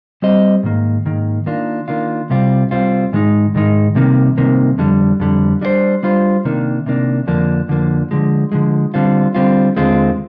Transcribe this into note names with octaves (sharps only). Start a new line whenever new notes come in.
G3 C4 G4 C5 D#5
G#2 D#3 A#3
G#2 D#3 A#3
D#3 A#3 D4 F4
D#3 A#3 D4 F4
C2 C3 G3 C4 F4
C2 C3 G3 C4 F4
G#2 D#3 G#3 D#4
G#2 D#3 G#3 D#4
C2 C3 D#3 A#3
C2 C3 D#3 A#3
F2 D3 G3
F2 D3 G3
G3 D4 F4 C5
G3 D4 F4 C5
C3 D#3 A#3 D4
C3 D#3 A#3 D4
F2 D3 F3 A#3 D4
F2 D3 F3 A#3 D4
D3 F3 G#3
D3 F3 G#3
D3 G3 C4 F4
D3 G3 C4 F4
D#2 D3 G#3 C4 F4